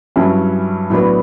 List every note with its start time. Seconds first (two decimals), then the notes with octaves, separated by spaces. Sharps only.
0.16 G2 F#3 C#4 E4
0.90 A2 F#3 B3 D4